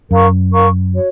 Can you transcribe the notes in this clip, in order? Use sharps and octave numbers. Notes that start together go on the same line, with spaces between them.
F#2 A#4 F5 A#5 C#6
A#4 F5 A#5 C#6
F#4 C#5